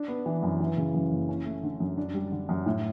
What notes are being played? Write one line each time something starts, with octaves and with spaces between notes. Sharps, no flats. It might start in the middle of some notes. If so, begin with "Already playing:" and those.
Already playing: D4
B3
E3
F#2
E3
C#3
F#2
F#1
C#4
A3
D3
F#2
D4
G3
D3
F#2
A2